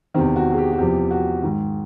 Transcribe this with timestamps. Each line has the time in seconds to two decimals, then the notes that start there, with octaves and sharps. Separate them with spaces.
0.14 E2 C3 D#3 C4
0.36 F#4
0.52 G#4
0.58 G4
0.73 F#4
0.78 E2 C3 F3 G4
1.11 F#4
1.43 G#2 D#3